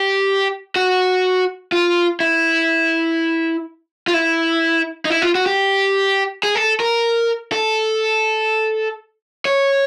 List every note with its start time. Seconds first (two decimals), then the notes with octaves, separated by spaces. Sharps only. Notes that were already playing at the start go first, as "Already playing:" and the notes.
Already playing: G4
0.76 F#4
1.72 F4
2.20 E4
4.08 F4
4.14 E4
5.05 D#4
5.10 E4
5.22 F4
5.35 F#4
5.46 G4
6.43 G#4
6.55 A4
6.80 A#4
7.52 A4
9.45 C#5